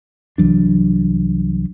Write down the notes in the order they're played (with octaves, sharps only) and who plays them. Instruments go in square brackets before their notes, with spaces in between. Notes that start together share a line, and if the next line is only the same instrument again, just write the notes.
[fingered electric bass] C2 E3 F#3 D4